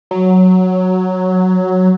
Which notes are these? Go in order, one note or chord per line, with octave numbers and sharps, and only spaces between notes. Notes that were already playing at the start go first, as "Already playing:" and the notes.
F#3